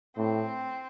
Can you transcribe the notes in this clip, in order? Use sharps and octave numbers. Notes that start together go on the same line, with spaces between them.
A2 C4